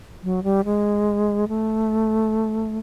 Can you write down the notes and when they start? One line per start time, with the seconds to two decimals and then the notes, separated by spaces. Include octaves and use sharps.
0.23 F#3
0.44 G3
0.65 G#3
1.48 A3